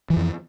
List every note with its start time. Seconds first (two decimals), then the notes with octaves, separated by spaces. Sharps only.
0.10 E3
0.13 F3
0.16 F2